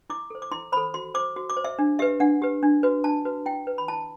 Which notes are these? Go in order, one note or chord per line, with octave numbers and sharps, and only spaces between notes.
E4 D6
A4 C5
D6
E4 C6
A4 C5 B5
F#4 C6
C5 D6
F#4
D6
C5
E5
D4
G4 B4 E5
D4 F#5
G4 B4
D4
F#4 B4
D4 A5
F#4 B4
E4 G5
B4
B5
E4 A5